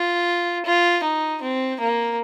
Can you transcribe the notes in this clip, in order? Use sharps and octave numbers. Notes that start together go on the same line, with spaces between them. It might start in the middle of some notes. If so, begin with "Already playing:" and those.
Already playing: F4
F4
D#4
C4
A#3